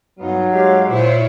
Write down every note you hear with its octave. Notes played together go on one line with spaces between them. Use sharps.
G2 F#3 B3 D#4 F4
G#3 G4 C#5 F5
A#2 E4 F4 C5 C#5